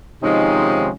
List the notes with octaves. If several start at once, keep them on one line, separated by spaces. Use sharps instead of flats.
C3 D#3 F3 G#3 C#4 D#4